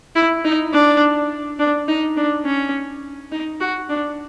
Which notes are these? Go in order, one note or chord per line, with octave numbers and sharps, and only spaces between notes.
E4
D#4
D4
D4
D#4
D4
C#4
D#4
F#4
D4